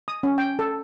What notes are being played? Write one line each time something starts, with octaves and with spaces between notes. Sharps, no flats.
D#6
C#4
G5
A4